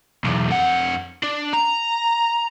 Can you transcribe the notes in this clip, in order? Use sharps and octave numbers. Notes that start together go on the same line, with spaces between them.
B1 E2
F2 F#5
D4
A#5